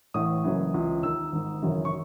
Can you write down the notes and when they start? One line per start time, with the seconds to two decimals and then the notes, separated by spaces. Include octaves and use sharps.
0.14 A1 A2 E3 D#6
0.44 F#1 F#2 C#3 E3
0.74 C#2 C#3 E3
1.03 D#2 D#3 E6
1.32 G#1 G#2 D#3
1.62 G#1 F#2 C#3 E3
1.85 C#6